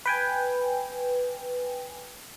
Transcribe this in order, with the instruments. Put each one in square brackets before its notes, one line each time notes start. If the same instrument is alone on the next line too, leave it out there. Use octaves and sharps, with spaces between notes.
[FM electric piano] B4 G5 G#5